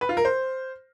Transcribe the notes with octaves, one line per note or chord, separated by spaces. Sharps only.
B4
F4
A#4
C5